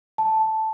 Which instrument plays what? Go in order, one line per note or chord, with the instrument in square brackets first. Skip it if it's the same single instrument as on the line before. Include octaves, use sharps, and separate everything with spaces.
[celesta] A5